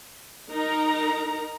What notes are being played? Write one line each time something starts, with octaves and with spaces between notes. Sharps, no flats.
D#4 A#4 A#5